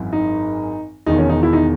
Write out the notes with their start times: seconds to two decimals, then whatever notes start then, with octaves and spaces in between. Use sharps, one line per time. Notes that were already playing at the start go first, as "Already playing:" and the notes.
Already playing: G#1 F#2 E3
0.13 D#4
1.06 E1 E2 D#3 D#4
1.19 C#4
1.29 D#4
1.43 E4
1.53 D#4